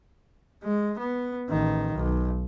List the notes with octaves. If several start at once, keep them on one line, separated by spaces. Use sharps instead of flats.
G#3
B3
A1 D#3
B1